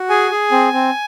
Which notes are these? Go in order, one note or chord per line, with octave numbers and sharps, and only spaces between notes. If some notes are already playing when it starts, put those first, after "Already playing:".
Already playing: F#4
G#4 G#5
G#4
C4
C4